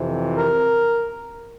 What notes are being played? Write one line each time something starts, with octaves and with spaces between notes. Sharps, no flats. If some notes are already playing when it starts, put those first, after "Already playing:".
Already playing: F2 C3 E3
A#4